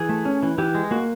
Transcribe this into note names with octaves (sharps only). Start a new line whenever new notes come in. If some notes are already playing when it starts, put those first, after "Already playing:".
Already playing: E3 G#4
A3
C#4
E3
E3 G4
G#3
A#3 F#4